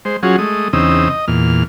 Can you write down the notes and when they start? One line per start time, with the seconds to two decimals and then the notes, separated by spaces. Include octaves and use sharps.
0.05 G#3 C5
0.23 F#3 C#4 F4 F#4 G#4
0.38 G#3 A3 D#6
0.73 E2 C#3 C4 D#4 D#6 E6
1.09 D#5
1.28 E2 A#2 F6